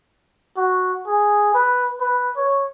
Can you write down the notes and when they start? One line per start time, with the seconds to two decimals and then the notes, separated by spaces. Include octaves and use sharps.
0.57 F#4
1.07 G#4
1.54 B4
2.01 B4
2.37 C#5